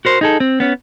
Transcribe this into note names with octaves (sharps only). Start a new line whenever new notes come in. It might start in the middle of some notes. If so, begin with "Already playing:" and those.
F#4 A#4 C5
D#4 G#4 A4
C4
B3 C#4